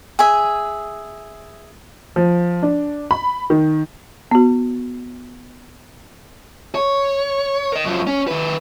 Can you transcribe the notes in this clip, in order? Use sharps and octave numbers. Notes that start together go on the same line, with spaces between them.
G#4 E5
F3
D4
B5
D#3
B3 F#4
C#5
A#4 D#5
F#2 F3
C#4
D#3 B4